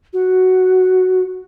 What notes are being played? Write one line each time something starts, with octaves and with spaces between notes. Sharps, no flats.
F#4